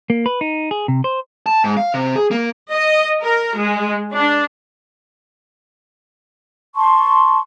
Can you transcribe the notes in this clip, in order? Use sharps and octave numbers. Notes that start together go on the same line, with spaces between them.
A#3
B4
D#4
G#4
C3
C5
A5
G#2
F5
C3
G#4
A#3
D#5
A#4
G#3
D4
A5 C6 C#6